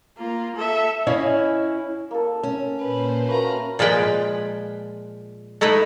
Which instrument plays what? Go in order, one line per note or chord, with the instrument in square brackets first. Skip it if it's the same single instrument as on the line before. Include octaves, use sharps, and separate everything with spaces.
[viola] A#3 F4
A4 E5
[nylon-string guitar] C#4 E4 C#5 D#5 F5 G#5
[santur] A#3 A4
[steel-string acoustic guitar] C#4
[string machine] A#2 C5 [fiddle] B4
[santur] A3 A#3 F#4 [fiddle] B4 A#5 [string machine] F6
[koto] A#2 F3 G#3 B4 G5
A3 D#4 E4 B4